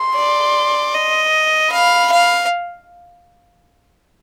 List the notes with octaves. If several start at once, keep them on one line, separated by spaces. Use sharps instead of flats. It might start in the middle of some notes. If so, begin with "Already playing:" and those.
Already playing: C6
D5
D#5
F5 B5
F5